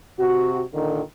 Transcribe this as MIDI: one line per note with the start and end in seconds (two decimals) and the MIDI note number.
0.20 0.63 48
0.20 0.63 66
0.74 1.01 46
0.74 1.01 50
0.74 1.01 51